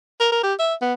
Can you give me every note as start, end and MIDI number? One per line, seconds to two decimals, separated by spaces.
0.20 0.31 70
0.32 0.42 70
0.43 0.54 67
0.59 0.74 76
0.82 0.94 59